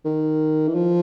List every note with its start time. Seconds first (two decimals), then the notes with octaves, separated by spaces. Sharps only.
0.05 D#3
0.68 E3
0.75 F3